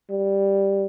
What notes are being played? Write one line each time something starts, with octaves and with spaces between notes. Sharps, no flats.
G3